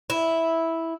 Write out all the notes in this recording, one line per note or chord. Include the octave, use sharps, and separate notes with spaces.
E4